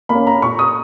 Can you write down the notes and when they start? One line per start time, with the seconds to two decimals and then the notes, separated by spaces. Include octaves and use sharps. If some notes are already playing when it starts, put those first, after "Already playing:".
0.09 A#3 B5
0.15 C#4
0.27 A#5
0.42 A#2 C#6
0.59 D#6